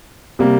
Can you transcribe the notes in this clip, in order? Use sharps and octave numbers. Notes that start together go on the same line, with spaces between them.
C3 G3 A#3